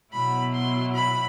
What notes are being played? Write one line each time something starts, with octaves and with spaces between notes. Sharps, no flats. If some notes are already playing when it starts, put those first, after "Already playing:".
B2 F#3 B3 E4 B5
C6
B5